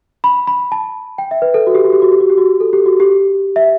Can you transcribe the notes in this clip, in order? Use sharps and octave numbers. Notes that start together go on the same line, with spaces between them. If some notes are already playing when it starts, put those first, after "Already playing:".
B5
B5
A5
G5
E5
B4
A4
F#4
G4
F#4
G4
F#4
G4
F#4
G4
F#4
A4
G4
F#4
G4
E5